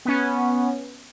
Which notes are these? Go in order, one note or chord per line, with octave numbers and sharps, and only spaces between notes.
B3 C#4